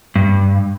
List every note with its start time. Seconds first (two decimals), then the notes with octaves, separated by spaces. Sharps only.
0.16 G2